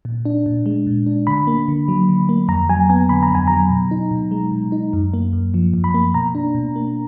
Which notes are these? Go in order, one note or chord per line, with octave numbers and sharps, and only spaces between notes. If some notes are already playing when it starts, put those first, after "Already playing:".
A#2
D4
A#2
G#3
A#2
D4
D3 B5
A#3
D3
F#3
D3
A#3
F2 A#5
F#3 G#5
B3 G#5
D3 B5
A#5
F2 G#5
F#3 A#5
B2
D#4
B2
G#3
B2
D#4
F#2
A#3
F#2
F3
F#2
B5
A#3
B2 A#5
D4
B2
A#3